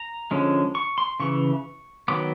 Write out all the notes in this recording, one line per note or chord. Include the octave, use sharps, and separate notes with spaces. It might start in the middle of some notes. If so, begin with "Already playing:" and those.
Already playing: A#5
D3 F3 G#3 C#4
C#6
C6
C#3 E3 C#6
D#3 F#3 B3 D6